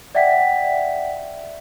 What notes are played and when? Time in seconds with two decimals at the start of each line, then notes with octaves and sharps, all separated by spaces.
0.15 D5 E5 F#5 G5 B6